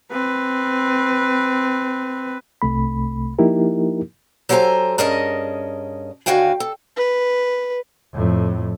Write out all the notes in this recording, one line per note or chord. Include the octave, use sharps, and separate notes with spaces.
C4 B4
C2 C3 A3 B5
F3 A#3 D#4 E4 G4 A#4
F#3 G4 A4 C5 G#5 A#5
G2 C#4 G#4 A#4 D#5 A5
D#2 D3 F#4 F5 G5 G#5
A4
B4
F2 A2